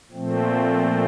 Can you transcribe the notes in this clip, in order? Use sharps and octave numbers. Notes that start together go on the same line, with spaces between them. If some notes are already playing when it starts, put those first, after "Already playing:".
A#2 F3 A3 C4